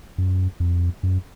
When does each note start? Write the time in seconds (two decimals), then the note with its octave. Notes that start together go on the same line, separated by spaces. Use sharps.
0.18 F#2
0.60 F2
1.03 F#2